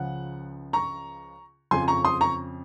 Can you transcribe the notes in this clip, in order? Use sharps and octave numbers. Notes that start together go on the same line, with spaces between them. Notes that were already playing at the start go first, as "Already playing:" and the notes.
Already playing: C#2 C#3 F3 F#5
A#5 C#6
F2 C#3 F3 G#5 C6
A#5 C#6
C6 D#6
A#5 C#6